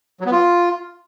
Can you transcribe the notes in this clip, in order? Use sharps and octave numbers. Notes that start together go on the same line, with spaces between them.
F#3
B3
F4